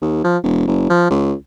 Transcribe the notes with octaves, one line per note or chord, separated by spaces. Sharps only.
D#2
F3
E1
F#1
F3
C#2